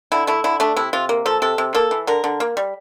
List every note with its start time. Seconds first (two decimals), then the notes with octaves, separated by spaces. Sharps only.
0.12 D3 E4
0.27 A3 E4
0.44 D3 E4
0.60 A3 D4
0.76 C3 E4
0.93 C3 F4
1.09 A#3
1.26 F3 A4
1.42 C3 A4
1.58 C3
1.75 A#3 A4
1.91 E3
2.07 D3 A#4
2.24 D3
2.40 A#3
2.57 G3